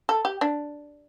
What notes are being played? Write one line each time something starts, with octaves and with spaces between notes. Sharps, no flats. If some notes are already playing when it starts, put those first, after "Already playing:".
A4
G4
D4